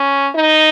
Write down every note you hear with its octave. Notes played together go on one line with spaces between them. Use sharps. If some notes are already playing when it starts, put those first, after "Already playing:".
Already playing: C#4
D#4